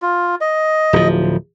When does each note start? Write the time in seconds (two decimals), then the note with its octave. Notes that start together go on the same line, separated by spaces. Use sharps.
0.02 F4
0.41 D#5
0.93 D1 F3